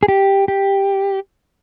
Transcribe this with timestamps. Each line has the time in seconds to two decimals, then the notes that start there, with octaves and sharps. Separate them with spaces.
0.03 G#4
0.08 G4
0.48 G4